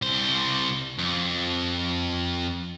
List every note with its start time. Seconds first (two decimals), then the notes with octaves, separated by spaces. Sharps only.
0.02 C2 C5
0.99 F2